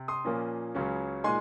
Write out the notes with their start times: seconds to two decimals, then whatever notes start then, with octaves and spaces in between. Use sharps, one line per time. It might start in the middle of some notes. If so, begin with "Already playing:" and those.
Already playing: C3
0.08 C6 D#6
0.24 A#2 F3 A#3 C#4
0.75 C#2 C#3 F#3 C#4
1.24 A#2 G#3 D#4 G#5 C6